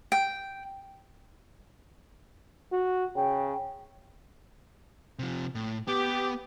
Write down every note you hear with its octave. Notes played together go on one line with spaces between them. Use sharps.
G5
F#4
C#3 G5
C3 F3
A2
B3 G4